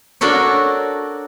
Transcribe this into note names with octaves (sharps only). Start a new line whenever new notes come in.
D4 F#4 A4 A#4 C#5